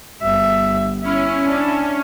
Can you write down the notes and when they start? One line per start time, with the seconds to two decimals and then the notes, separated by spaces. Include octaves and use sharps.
0.22 G1 E5
1.04 C#4 E4
1.47 D4 A5